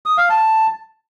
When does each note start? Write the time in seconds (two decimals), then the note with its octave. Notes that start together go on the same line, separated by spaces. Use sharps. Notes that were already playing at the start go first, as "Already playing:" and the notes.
0.06 D#6
0.18 F5
0.30 A5